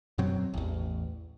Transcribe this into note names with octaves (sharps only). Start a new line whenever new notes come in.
F#2 B2 F#3 C4
A1 E2